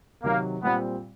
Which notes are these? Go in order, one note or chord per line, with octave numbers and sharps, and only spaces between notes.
C3 D#3 F#3 A#3
A#2 G3 B3 C4